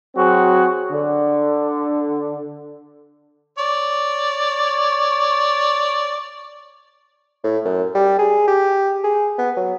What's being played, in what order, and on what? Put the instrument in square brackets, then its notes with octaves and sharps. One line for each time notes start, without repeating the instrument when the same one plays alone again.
[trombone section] F#3 C4 F#4 G#4
D3
[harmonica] C#5 D5
[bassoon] A2
F#2
G3
G#4
G4
G#4
B3
F#3